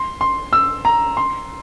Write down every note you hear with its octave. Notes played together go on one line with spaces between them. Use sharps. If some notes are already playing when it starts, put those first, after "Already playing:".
Already playing: C6
C6
E6
A#5
C6